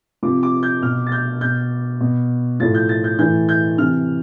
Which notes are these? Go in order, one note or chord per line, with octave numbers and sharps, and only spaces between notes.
C3 F3 D6
D6
G6
B2 F6
A6
G6
B2 G6
B2
A2 F3 A6
G6
A6
G6
A2 E3 G6
G6
C3 E3 F6